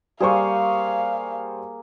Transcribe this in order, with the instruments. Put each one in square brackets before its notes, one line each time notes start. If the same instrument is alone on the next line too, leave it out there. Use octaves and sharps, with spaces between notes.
[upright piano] G3 C5 C#6 [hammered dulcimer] A#3 G#4 [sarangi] F5